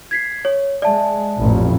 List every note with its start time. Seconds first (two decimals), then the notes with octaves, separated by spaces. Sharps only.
0.11 G#6 B6 C7
0.45 C#5
0.82 G#3 D5 E5 A5
1.40 A1 F2 A#2